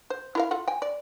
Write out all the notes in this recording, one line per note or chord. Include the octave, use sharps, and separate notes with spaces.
C5
E4 A#4 F5
F4 A4 F#5
G5 G#5
D5